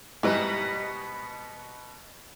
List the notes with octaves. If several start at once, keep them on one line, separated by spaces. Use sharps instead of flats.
G#2 B2 G3 B3 E4 B4 D#5